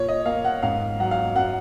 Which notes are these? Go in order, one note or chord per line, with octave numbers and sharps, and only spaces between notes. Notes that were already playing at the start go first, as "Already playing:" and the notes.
Already playing: A#2 C#5
D#5
A#3 F5
F#5
G#2 F5
F#3 F#5
F5
F#2 F#5